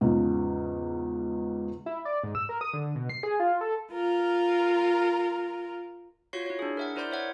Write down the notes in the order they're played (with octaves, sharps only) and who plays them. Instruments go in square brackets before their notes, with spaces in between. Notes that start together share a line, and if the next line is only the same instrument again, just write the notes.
[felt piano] E2 G#2 C#3 F3
[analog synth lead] E4
D5
G#2
E6
A#4
D#6
D3
B2
C7
G#4
F4
A4
[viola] F4 A#4
[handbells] F4 F#4 C#5 C#6 C7
E4 C#5
D4 G#4
A#4 E5 F#5
E4 A#4 C5 D5 C6 G6
C#5 E5 F#5